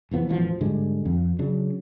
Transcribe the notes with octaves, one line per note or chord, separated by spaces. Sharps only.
F1 E2 F3 B3
E1 A1 B2 F3
G#2 D3 G3 G#3
F2
C#3 F#3 D4